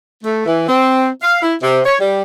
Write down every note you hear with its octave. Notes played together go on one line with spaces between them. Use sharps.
A3
E3
C4
F5
E4
C3
C#5
G3